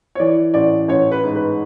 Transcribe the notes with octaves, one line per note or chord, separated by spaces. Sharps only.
C#5
E3 D5
A1 D5
A1 C#5
B4
G#2
B4